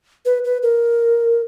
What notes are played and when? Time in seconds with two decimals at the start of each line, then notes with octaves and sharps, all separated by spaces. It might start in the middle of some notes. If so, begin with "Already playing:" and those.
0.26 B4
0.45 B4
0.63 A#4